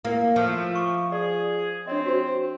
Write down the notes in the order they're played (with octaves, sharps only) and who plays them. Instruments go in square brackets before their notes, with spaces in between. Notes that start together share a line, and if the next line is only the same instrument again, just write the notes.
[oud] A#3 [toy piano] E4 A#4 G5
[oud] F3 [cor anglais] A3
[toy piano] C#6 D6
[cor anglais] G#4 [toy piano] D5
[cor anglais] C4 [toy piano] D4 C#5 D#5
[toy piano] F#4 C5